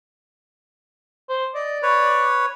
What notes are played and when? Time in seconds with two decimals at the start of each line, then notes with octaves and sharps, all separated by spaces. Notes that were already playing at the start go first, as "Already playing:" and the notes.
1.29 C5
1.55 D5 D#5
1.82 B4 C#5